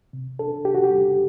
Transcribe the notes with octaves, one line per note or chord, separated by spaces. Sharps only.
C3
D4 A4
C3 G4
F#4
G4
G3